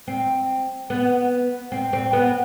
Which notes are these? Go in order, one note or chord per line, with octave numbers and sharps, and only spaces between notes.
C4
B3
C4
C4
B3